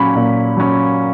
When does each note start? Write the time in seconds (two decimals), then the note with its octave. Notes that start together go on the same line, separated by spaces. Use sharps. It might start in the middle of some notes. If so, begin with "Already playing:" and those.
Already playing: A#2 F#3 C#4 B5
0.15 A#2
0.57 F#3 C#4